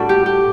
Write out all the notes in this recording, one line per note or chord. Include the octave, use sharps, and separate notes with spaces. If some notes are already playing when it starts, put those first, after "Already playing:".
Already playing: A2 G3 D4 F#4 A4
G4
G4